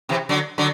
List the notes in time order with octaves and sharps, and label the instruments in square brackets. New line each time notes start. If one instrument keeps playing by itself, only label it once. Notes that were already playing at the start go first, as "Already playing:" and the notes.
[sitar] C3 E3
D3 F#3
D3 F#3